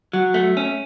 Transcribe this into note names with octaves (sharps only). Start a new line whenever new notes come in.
F#3
A3
C#4